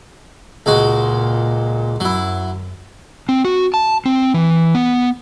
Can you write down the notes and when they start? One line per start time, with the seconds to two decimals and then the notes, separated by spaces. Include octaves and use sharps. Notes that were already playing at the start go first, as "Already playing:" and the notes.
0.66 C#2 A#2 G#3 F#4
2.00 F#2 F#3 E4
3.29 C4
3.45 F#4
3.74 A5
4.05 C4
4.34 E3
4.75 B3